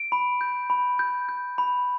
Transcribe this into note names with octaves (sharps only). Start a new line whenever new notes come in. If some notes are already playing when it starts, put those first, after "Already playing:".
Already playing: D7
B5
G6
B5
G6
G6
B5